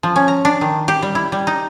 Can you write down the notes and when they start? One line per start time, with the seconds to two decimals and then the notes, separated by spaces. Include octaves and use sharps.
0.03 F3
0.16 C#4
0.28 A#5
0.45 D4
0.61 D#3
0.88 G4
1.02 G3
1.15 E4
1.32 G3
1.47 D#4